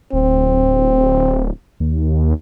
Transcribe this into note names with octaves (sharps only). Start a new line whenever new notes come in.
D1 C4
D#2